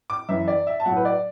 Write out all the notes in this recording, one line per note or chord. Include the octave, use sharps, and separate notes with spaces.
D6
F#2 E3 E5
D5
E5
A5
A2 F#3 F#5
B4
D5